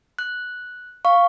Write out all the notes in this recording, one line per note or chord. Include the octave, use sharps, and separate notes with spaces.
F#6
F5 C#6